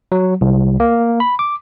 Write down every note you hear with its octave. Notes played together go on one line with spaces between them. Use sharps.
F#3
C2
A#3
B5
D6